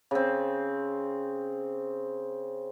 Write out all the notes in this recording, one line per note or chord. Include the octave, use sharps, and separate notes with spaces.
C#3 C4